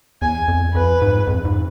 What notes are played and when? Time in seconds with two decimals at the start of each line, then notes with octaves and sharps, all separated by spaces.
0.22 E2 G#5
0.48 F2
0.74 F2 B4
1.02 G#2
1.27 F2
1.45 G#2